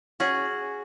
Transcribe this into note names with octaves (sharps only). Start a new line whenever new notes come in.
C#4 F#4 G#4